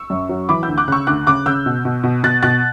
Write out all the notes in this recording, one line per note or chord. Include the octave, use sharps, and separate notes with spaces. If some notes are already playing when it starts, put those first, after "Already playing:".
Already playing: C#6 E6
F#2
F#3
E3 B5 D6
E6 G6
D2
D6 F#6
C#3 C#6 E6 F#6
D2 D6 F#6
C#3 D6 F#6
C#3 E6 G6
B2
B2
B2
B2 F#6 A6
B2 F#6 A6